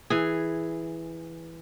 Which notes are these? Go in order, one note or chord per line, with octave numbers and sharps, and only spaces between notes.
E3 G#4